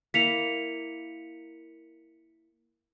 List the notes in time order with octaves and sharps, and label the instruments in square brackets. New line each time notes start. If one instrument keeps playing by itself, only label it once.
[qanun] A#3 E4 [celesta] B6 C#7 F7